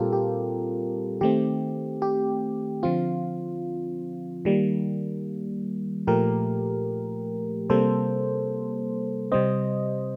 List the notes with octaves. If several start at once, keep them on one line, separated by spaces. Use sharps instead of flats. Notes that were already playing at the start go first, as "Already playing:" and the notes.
Already playing: A#2 G3 C4 F4 G4 A4 A#4
G4
D#3 A3 C4 G4
G4
D3 F3 C4 F4
D#3 G3 A#3
A#2 F3 A3 G4 A#4
C3 G3 A#3 A4 C5
C3 G3 C4 C5 D#5